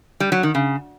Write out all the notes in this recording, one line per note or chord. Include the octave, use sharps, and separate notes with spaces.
G3
F#3
D#3
C#3